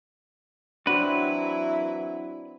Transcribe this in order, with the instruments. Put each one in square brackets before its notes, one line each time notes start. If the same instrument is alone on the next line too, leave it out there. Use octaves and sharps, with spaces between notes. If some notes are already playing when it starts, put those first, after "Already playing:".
[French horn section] E3 F#3 E4 [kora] C4 F#4 [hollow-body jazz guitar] D4 [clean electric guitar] B4